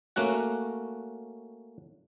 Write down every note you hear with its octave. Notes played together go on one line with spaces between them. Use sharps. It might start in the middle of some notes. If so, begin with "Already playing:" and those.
A3 A#3 C#4 F#4 F#5